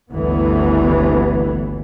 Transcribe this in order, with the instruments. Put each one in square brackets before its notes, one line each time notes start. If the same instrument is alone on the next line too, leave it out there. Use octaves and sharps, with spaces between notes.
[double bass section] G1 D2 E3 B3